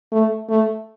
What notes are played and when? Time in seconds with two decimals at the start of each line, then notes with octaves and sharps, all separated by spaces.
0.12 A3
0.49 A3